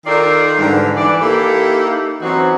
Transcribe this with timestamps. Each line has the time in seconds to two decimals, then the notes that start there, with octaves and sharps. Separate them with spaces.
0.06 D#3 D#4 F4 A4 A#4 D5
0.58 G#2 D3 E3 G3
0.96 E3 D5
1.21 A#3 D#4 E4 G4 A4
2.22 E3 F#3 C4 C#4 D#4 F#4